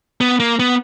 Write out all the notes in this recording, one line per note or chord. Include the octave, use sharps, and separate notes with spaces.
B3
A#3
B3